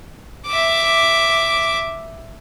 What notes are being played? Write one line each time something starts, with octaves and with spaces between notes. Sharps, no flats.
E5 D6